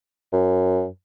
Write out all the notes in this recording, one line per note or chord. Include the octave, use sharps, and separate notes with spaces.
F#2